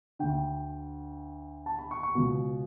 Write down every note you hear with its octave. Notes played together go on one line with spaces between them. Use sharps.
D2 D3 G5
A5
B5
C#6
C#6
C#2 B2